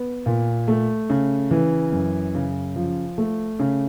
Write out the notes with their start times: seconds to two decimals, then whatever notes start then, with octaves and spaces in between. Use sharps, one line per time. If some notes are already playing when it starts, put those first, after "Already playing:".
Already playing: B3
0.26 A#2
0.68 A3
1.10 C#3
1.51 E3
1.92 F#2
2.35 C#3
2.76 F3
3.18 A3
3.59 C#3